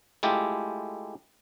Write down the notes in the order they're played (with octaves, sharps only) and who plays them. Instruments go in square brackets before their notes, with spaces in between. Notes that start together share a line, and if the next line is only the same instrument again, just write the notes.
[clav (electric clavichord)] G#3 A3 E4 F4 G4